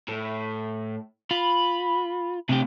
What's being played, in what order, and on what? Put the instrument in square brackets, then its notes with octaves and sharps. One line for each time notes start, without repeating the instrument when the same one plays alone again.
[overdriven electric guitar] A2
[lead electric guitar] F4 [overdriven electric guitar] B5
[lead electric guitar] C3 G4 [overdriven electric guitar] A3 C4